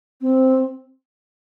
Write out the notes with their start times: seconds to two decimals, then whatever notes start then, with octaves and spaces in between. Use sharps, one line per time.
0.21 C4